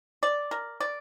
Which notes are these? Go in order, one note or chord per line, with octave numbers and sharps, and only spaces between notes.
D5
A#4
D5